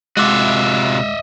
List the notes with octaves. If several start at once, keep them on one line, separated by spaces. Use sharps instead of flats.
C3 G#3 F4 F#4 D#5 E5 D6